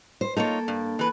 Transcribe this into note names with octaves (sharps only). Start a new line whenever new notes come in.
C5
A#3 D#4 F4 A4 C#5
G2
E3 B4